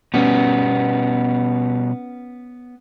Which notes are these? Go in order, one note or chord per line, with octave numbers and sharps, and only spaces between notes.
B2 G3 B3 C#4